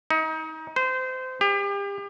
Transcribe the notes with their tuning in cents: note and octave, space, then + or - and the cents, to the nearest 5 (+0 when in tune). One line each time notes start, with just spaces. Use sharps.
D#4 +30
C5 -25
G4 +35